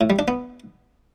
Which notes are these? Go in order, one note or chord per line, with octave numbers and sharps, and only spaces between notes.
A2
G3
D4
B3